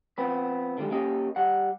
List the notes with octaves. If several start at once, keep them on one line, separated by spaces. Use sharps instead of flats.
F3 B3 C4 B4
D3 D#3 F3 G3 G#3
A#3 C#4 G4 D#5
G3 F#5